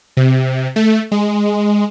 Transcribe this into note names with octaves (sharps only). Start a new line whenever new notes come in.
C3
A3
G#3